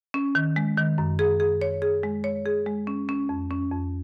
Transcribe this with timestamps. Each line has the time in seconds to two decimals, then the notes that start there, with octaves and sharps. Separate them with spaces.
0.14 C#4
0.35 D#3
0.56 G#3
0.77 D#3
0.98 F#2
1.19 G#4
1.40 G#4
1.61 C#5
1.82 G#4
2.03 G#3
2.24 C#5
2.46 G#4
2.66 G#3
2.87 C#4
3.09 C#4
3.29 F2
3.51 C#4
3.72 F2